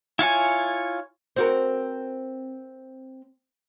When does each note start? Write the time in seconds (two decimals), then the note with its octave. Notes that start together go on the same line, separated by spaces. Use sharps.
0.19 E4 F4 C#5 G#5
1.36 C4 F#4 A#4